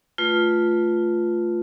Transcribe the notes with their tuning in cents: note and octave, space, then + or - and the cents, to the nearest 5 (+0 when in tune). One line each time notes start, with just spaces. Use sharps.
A3 +0 F4 +0 B4 -10